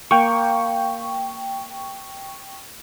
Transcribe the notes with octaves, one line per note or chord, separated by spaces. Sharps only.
A#3 G5 C#6